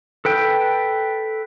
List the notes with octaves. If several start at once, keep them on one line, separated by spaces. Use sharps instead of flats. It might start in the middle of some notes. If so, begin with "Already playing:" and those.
A4 B4 G5